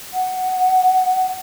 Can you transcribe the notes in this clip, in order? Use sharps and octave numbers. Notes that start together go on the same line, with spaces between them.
F#5